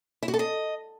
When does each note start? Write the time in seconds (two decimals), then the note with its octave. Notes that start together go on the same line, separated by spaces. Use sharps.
0.23 E4
0.28 F#4
0.34 A4
0.39 D#5